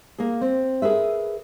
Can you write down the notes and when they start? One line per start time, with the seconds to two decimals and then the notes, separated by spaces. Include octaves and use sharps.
0.18 A#3 G#4
0.41 C4
0.82 G#4 A#4 B4 E5